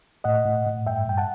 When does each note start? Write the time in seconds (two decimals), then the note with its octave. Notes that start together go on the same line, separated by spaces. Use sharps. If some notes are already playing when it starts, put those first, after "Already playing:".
0.24 A2 D#5 F#5
0.46 A2
0.66 A2
0.87 G2 E5 G5
1.08 G2 G5
1.18 F#5 A5